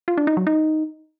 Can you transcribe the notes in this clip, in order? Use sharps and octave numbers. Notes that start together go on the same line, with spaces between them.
F4
D4
D#4
F#3
D#4